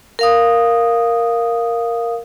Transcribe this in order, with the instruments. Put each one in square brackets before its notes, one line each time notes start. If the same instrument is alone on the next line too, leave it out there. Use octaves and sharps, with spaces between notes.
[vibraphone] A#4 F5 D#6